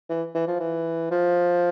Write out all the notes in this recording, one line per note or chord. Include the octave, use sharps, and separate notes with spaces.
E3
E3
F3
E3
F3